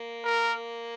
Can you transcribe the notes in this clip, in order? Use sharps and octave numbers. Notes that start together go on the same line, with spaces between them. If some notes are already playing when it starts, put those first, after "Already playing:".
Already playing: A#3
A#4